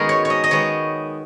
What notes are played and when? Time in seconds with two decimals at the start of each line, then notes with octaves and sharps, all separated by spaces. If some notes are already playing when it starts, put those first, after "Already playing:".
Already playing: D#3 G#3 B3 F#4 G#4 A#4
0.09 C#5
0.25 C#5
0.30 D#5
0.44 D#5
0.51 D#3 G#3 B3 C#5